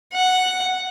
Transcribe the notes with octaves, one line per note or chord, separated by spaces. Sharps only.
F#5